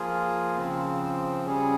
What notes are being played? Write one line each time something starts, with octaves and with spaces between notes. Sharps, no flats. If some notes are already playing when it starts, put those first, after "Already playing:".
Already playing: F3 A#3 F4 G#4
C#3 F3 C4
C#3 G3 C#4 G#4